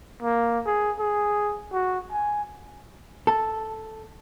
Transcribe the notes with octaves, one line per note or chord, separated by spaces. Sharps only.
A#3
G#4
G#4
F#4
G#5
A4